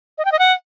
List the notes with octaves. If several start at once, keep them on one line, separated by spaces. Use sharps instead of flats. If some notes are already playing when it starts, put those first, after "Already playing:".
D#5
G5
D#5
F#5